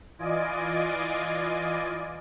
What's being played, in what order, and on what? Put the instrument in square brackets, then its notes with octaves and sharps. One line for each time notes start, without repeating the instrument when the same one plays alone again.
[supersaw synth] E3 F4 D5 D#5 G#5 D6